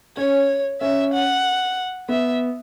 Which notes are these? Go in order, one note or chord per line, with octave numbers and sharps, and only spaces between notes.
C#4 C#5
C#4 E5
F#5
B3 E5